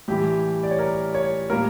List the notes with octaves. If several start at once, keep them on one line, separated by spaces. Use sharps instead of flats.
A2 E3 G3 G4
D5
C#5
A#4
C#5
A2 G3 A#3 A#4